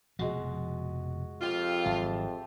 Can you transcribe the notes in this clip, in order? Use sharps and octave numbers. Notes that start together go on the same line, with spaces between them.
F1 B2 F3 G#3 F#4
F2 C4 F4 G4
G#1 F#3 E5 A5